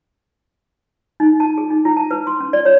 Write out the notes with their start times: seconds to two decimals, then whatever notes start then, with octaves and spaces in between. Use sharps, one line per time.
1.20 D#4
1.40 A5
1.58 G#4
1.71 D#4
1.85 E4
1.97 A5
2.11 B4
2.27 C6
2.41 C#4
2.53 D5
2.65 C#5